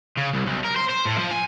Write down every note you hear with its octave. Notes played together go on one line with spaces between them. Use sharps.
C#3
C2
B1
A#4
C5
C5
A2
F3
G#5